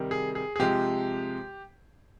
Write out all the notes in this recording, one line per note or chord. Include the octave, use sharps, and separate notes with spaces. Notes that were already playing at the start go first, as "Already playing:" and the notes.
Already playing: C3 D#3 G3
G#4
G#4
G#4
C3 F3 G#3 G4